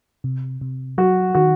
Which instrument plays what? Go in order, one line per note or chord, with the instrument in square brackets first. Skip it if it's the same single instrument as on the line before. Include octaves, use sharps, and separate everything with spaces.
[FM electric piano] C3
C3
[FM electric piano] F#3 [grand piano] F#4
[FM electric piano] D#3 [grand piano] F#4